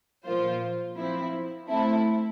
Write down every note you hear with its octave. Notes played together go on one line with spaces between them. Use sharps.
A#2 F3 A#3 F4 C5
F3 C4 E4
A3 C4 E4 A4